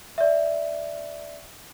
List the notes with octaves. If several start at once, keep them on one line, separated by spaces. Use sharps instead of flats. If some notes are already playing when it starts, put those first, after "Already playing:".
D5 E5